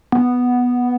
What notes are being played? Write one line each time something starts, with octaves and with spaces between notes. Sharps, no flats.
B3